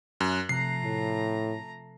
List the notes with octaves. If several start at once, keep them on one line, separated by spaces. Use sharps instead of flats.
F#2 F#6
C3 F3 A3 A#5 C7
A2